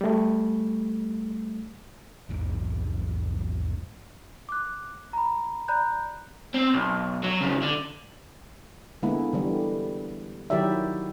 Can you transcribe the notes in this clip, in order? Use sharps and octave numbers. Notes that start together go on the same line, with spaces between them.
G3 A3
A#1 E2 G#2 E3
D6 F#6
A#5 B5
D5 A#5 B5 F#6 G6
C4
B1
F#3
F2 C#3
D3
D3 G#3 A#3 B3 E4
D3 E3 G3
D#3 F#3 E4 G4 D5 E5